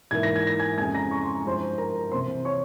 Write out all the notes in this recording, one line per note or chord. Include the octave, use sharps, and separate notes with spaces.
G#2 E3 A#3 E4 G#6
A#6
G#6
A#6
G#5 G#6
F2 C#3 F3 G#3 E4 G#5 G#6
A#5 A#6
C#6
C6
A#5
G2 F3 G#3 E4 C5 C6
A#4 A#5
C2 C3 E3 C5 C6
C#5 C#6